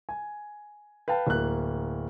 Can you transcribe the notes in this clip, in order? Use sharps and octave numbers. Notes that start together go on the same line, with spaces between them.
G#5
B4 F5 G5 A5
D1 A#3 F#6